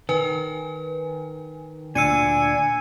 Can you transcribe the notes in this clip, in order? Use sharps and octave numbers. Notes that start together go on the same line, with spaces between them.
D#3 B4 G#5
D2 A#2 D4 G#5 E6 C#7 D#7